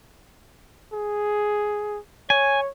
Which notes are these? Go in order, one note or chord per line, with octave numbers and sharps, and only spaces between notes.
G#4
C#5 G#5